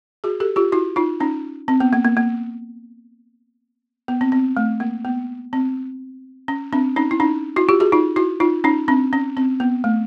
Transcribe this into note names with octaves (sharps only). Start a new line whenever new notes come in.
F#4 G#4
G4 A4
F4 G4
E4 F#4
D#4 F4
C#4 D#4
C4
B3
A#3
A#3
A#3
B3
C4
C4
A3
A#3
B3
C4
C#4
C4 D4
C#4 D#4
E4
C#4 D#4
E4 F#4
F4 G4
F#4 G#4
D#4 F4
E4 F#4
D#4 F4
C#4 D#4
C4 D4
C#4
C4
B3
A3